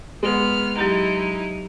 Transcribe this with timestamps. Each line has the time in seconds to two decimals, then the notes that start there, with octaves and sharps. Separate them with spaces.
0.23 G#3 B3 F6
0.77 F#3 D#4 E4 G4 A#5